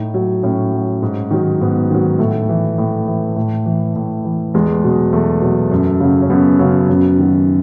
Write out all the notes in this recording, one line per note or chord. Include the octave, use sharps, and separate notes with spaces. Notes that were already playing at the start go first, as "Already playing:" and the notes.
Already playing: A2 D#4
F#3
A2 C#4
F#3
G#2
D#3 F#3
G#2 B3
D#3 F#3
A2 A3
E3
A2
E3
A2
E3
A2
E3
E2 G#3
B2 F#3
E2 A3
B2 F#3
F#2
C#3 F#3
C#4
F#2 B3
C#3 F#3
F#2
D#3 F#3